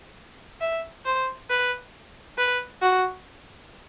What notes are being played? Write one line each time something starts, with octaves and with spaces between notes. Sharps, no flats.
E5
C5
B4
B4
F#4